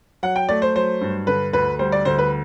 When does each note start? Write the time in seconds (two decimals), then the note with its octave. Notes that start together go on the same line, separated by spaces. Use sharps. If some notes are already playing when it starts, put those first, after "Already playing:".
0.23 F#3 F#5
0.36 G5
0.49 A3 D5
0.62 C5
0.76 F#3 C5
1.01 G2
1.27 D3 B4
1.53 D2 B4
1.79 G3 C5
1.92 D5
2.05 D2 C5
2.18 B4